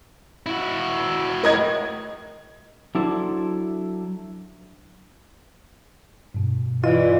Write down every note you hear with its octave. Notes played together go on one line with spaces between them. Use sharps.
E4 F#4
A2 A#4 D#5 G#6
F#3 D4 E4 A4 C5
G2 B2
E3 F4 D5 D#5